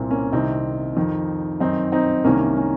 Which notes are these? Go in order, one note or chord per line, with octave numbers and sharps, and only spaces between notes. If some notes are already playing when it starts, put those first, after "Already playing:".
Already playing: C2 A#2 A#3 C4
A#3 C#4
C2 C3 D#3 C4 D#4
F2 D#3
F#2 D#3 C4 D#4
C4 D#4
C2 C3 D#3 A#3 C#4
A#3 C#4